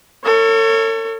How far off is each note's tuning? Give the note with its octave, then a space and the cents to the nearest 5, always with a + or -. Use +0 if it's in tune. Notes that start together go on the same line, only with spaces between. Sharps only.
A4 +40 C#5 +0